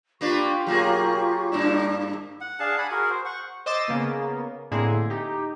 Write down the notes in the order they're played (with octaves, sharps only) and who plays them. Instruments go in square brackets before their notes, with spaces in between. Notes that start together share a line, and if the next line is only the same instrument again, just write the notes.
[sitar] A#3 D4 B4 [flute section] F4 G4 C#6
[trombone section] B1 A#4 [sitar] F#3 A#3 G#4
[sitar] G2 A#3 E4 [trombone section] D4
[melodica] F#5
D4 G#4 F5 A5
F#5 G#5 B5
F#4 G#4 A#4
C5
F#5 C#6
[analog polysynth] C5 D#5 D6 E6 A6
C#3 A#3 B3
A2 D3 A#3 C4 E4 G#4
D#4 G4